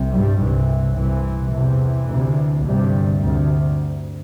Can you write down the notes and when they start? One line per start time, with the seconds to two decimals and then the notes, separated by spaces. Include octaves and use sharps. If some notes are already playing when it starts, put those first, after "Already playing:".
Already playing: C2 C3
0.12 G2 G3
0.39 C2 C3 E3
0.96 C2 C3 E3
1.52 E2 C3 E3
2.08 D2 C3
2.64 D2 G2 C3 G3
3.20 D2 C3